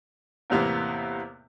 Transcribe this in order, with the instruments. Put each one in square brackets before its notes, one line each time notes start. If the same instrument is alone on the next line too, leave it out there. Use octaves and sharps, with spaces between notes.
[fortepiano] E2 A2 C3 A#3 B3